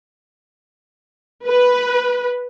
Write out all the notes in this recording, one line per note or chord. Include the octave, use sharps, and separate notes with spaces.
B4